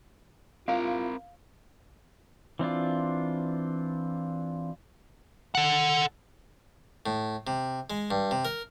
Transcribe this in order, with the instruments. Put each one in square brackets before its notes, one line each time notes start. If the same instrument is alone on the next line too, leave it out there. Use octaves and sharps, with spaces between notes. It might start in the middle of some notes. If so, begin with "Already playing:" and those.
[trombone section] G2 E4 F4 [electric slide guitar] C4 A#4 [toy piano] F5
[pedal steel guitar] E3 C4 D4 F4
[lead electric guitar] A4 F#5
[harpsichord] A2
C3
G#3
G2
C3
A#4